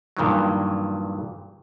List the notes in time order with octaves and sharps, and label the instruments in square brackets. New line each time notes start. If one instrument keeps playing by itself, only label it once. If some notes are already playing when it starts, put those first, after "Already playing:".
[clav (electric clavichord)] G2 A#2 D#3 E3 F#3